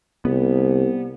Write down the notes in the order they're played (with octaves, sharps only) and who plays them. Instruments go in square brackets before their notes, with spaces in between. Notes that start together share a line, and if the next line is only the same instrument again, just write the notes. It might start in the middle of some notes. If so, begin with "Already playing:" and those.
[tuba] C2 [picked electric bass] B3